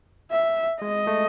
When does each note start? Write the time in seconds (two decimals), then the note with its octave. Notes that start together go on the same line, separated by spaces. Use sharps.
0.31 E5
0.82 G#3 D#5
1.07 A3